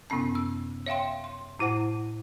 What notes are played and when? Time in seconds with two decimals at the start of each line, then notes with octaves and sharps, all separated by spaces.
0.10 F#2 C3 B3 C#4 A5
0.35 E6
0.86 C#5 E5 F5 G5 C6
1.24 C6
1.59 A2 E4 C5 F#5 A5